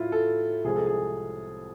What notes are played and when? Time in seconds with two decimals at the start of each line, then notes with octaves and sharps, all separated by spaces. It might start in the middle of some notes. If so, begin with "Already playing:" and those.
Already playing: A2 F#3 A3 E4 F4
0.12 A4
0.64 C2 C3 F3 G#3 G#4
0.76 A4
0.87 G#4